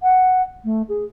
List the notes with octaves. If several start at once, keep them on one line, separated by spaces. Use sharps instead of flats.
F#5
A3
G#4